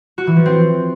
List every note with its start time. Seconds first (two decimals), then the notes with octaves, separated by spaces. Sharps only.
0.18 F#4
0.27 E3
0.36 F3
0.46 C4